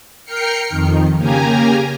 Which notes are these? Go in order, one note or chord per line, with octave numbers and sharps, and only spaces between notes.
A#4 G5 F6 C7 C#7
F2 D#3
C#3 A#3 G4 G#5 A#5